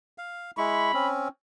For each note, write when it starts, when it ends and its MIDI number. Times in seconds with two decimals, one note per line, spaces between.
0.18 0.51 77
0.58 0.92 56
0.58 0.92 64
0.58 1.09 83
0.58 0.92 85
0.94 1.28 60
0.94 1.28 61